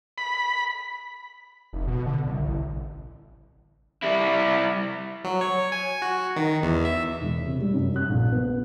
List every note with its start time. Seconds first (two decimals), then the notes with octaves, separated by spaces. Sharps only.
0.18 B5
1.73 F1
1.88 B2
2.06 D3
2.27 C2
2.45 A1
4.03 G3 E4
5.24 F#3
5.41 C#5
5.72 G#5
6.02 F#4
6.36 D#3
6.63 E2
6.85 E5
7.21 E1
7.46 C3
7.61 G3
7.73 F#2
7.96 F#6
8.09 A#1
8.32 B3